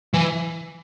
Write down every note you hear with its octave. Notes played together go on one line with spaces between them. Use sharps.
E3